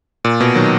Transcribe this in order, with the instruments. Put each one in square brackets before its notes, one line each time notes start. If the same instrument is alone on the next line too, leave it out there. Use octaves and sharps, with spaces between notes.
[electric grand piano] A#2
B2
D#3 F#3